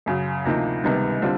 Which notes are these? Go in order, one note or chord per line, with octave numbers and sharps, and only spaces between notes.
F#2 C#3 F#3
D2 C3 F3 A#3 D#4
C#2 C3 D#3 G3 B3
D3 G3 C4 F4